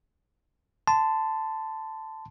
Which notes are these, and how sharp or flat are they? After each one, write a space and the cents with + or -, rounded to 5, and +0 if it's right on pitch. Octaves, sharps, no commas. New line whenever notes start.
A5 +0 C6 -25